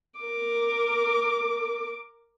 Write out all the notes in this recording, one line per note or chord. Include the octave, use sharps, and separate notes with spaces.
A#4 D6